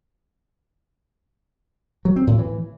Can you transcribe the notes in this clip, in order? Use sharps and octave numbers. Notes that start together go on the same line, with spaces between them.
F#3
C4
A2
E3